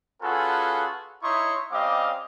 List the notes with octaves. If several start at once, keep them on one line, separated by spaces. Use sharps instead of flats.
C#4 F4 F#4 G#4 A4 B4
D#4 E4 C#5 C6 C#6 D#6
G3 C4 C#4 D#5 F5 D6